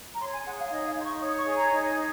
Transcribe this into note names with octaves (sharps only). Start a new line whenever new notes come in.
A#5
C#5 C6
G#5
G#4 F#5
F5
D#4 D#5
F5
D#4 C6
C#6
C#5 D#6
C#6
G#4
A#5
D#4
D#4